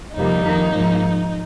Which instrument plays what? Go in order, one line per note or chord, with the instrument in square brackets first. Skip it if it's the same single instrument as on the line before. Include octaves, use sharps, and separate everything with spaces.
[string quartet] F2 C3 G3 A#3 D#4
F2 D#3 A#3
G#2 F3 A#3